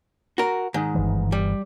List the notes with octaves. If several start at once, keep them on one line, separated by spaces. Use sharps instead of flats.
F#4 A#4
G#2 D#3
G1 E3
G3